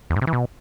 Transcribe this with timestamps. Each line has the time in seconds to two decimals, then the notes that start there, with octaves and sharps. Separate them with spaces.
0.10 E2
0.16 G#2
0.22 C3
0.27 E3
0.33 B2